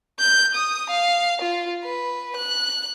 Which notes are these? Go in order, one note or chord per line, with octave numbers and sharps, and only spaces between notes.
G6
D#6
F5
F4
B4
F#6